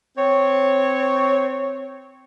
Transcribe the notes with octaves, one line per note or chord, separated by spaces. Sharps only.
C4 C#5